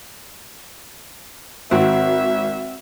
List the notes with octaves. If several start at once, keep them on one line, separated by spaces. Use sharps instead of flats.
G#1 C4 F#4 E5